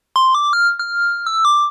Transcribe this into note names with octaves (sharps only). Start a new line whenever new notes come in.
C6
D6
F6
F6
E6
D6